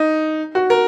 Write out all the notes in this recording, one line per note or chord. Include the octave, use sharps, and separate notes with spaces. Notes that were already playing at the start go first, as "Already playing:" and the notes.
Already playing: D#4
F#4
A#4